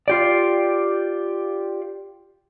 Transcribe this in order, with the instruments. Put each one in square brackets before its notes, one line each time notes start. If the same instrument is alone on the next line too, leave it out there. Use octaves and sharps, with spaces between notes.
[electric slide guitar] F4 G4 D5